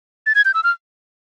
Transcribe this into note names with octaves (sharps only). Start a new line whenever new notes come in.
A6
G#6
G6
E6
F6